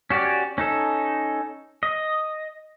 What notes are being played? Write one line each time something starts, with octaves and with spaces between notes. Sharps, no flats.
C#4 F#4 G4 D5
C#4 D#4 A4
D#5